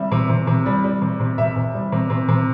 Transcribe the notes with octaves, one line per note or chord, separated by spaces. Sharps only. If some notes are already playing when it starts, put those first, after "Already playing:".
Already playing: C3 G3 E5
C3
C3
C3
G3
G3
C3
C3
C3 E5
C3
G3
C3
C3
C3